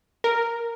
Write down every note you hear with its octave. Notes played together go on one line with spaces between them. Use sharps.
A#4